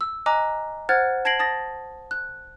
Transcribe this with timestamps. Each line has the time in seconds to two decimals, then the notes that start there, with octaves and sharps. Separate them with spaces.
0.01 E6
0.26 D#5 G#5 A#5 D6 F#6
0.89 C5 F#5 F6 F#6 G#6 A6
1.25 A5 G#6 A#6 C7 D7 F#7
1.39 A5 D#6 A6 A#6
2.11 F#6